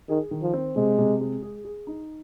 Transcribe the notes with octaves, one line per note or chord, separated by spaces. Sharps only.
D#3 G#4
D#3
F3
C4
C3 G#3
C3
G#3
G#4
G#4
D#4